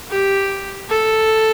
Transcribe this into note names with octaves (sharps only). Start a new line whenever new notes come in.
G4
A4